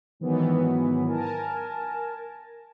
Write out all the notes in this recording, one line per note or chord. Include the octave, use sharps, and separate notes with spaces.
G#2 D#3 E3 F#3 B3
A#4 G#5 A5